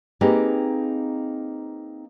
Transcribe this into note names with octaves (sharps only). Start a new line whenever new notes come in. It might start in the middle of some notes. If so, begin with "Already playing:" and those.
A#3 C4 D#4 G4 G#4 B4